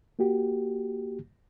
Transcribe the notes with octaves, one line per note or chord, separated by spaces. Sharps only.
A#3 F#4 G4